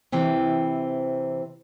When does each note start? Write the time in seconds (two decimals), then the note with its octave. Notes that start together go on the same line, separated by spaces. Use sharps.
0.12 C3 E3 C4